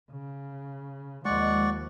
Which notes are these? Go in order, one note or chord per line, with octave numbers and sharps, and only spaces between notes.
C#3
D#2 F3 G#3 D5 F#5 C#6